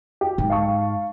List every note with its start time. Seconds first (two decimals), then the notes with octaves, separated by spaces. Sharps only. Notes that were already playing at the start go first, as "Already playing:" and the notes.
0.21 G4
0.38 G#2
0.50 F5 A5 C#6